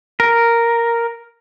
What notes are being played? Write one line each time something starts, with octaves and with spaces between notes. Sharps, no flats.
A#4